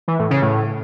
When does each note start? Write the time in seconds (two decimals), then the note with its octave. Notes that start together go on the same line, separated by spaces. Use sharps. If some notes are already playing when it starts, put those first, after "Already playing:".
0.08 E3
0.19 A2
0.31 C#3
0.42 A2